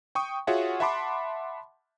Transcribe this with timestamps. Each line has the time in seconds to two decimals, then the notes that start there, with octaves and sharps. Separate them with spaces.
0.15 G5 C#6 D#6
0.47 F4 F#4 G#4 C#5 E5 F#5
0.80 E5 F#5 A5 B5 C6 D6